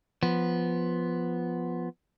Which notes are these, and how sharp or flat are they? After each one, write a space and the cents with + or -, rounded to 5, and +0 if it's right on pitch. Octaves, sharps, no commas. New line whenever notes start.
F3 +0 B3 +0